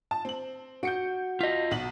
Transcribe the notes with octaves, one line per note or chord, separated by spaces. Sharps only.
A5
C4 F#7
F#4 G6 C#7 D7
F4 D#5 B6
B1 F#4 F#7